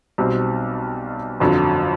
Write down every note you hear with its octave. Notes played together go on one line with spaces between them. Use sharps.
B1 B2 G3 C4
G1 F2 D3 F#3